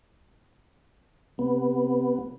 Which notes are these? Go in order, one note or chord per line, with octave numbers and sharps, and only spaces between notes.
C3 B3